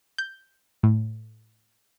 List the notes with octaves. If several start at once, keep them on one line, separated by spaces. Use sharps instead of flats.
G6
A2